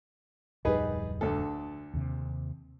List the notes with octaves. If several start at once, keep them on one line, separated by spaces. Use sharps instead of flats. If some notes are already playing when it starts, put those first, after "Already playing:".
D1 F2 G3 D#4 G#4 B4
D2 D3 A4
D#2 C3